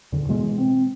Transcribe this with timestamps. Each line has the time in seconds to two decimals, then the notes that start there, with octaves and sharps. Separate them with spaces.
0.12 E2 D3
0.29 B2 E3 G#3 B3
0.58 C4